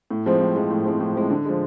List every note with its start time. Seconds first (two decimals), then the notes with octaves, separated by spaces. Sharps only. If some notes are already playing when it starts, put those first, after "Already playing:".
0.10 A2
0.26 F3 G#3 C4
0.40 A2
0.56 F3 G#3 C4
0.70 A2
0.85 F3 G#3 C4
1.00 A2
1.16 F3 G#3 C4
1.30 D3
1.45 F3 G#3